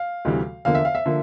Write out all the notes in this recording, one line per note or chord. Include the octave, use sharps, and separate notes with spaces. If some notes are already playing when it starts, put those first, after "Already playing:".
Already playing: F5
D2 C3 E3 G3
E2 D3 F3 A#3 F5
E5
F5
E5
D3 F3 A#3